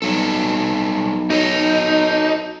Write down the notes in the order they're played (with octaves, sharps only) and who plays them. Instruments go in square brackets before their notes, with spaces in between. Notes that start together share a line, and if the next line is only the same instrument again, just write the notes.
[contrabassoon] B1 [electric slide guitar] F#3 G3 A4
[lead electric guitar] D#4 [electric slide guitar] F#4 A4 C#5